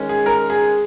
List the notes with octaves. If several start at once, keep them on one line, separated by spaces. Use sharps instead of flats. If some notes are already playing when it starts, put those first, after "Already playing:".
Already playing: D#3 G#3 C#4
G#4
A#4
G#4